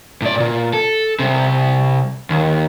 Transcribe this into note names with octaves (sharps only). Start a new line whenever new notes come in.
A2 D5
A#2
A4
C2 C3
D#2